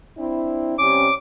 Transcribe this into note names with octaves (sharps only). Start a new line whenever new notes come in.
C4 D4 E4
C3 G3 C#4 D6